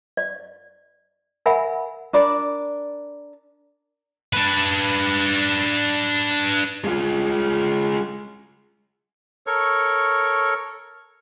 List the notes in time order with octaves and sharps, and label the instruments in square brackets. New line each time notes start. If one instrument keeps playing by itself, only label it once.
[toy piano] D5
A#4 E5 F#5 G#5 B5
[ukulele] D4 A#4 D5 B5
[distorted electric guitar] D4 B4
[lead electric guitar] G#3 F4
[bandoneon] A4 A#4 C#5 C#6